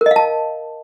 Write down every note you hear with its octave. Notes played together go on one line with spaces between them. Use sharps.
A#4
D#5
F5
A5